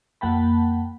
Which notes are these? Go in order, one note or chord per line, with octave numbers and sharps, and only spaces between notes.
F2 A#3 F#5 G5 A5 B5